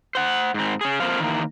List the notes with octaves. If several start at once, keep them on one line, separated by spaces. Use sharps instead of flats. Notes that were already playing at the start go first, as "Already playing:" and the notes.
C5 F#5
G#2 C4
C#4 G#4
A3 A#3 C4 F4 C5 F5
D#3 E3 G#3 A#3